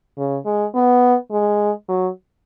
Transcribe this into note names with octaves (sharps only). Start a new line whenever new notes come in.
C#3
G#3
B3
G#3
F#3